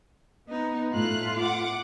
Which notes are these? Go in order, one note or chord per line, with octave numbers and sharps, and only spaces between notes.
B3 D#4
A2 A3 F4 F#6
F#5 D6